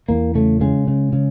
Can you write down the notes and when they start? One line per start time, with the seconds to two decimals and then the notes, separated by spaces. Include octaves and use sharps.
0.08 E2 A#3
0.35 C#3 A3
0.61 C#3 G#3
0.88 C#3
1.13 C#3